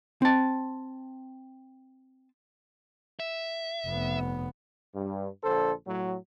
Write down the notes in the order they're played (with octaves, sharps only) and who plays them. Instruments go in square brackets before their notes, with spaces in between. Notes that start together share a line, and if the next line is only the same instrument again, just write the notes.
[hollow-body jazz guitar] C4 A5
[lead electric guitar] E5
[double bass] F1 B3
[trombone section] G2
A#1 D3 A4 C5
A2 F#3